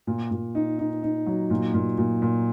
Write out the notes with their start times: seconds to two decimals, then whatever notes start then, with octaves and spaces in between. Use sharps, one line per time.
0.07 A#2
0.31 A#2
0.55 D#4
0.79 D#4
1.03 D#4
1.26 F#3
1.50 A#2
1.74 A#2
1.98 A#2
2.22 A#2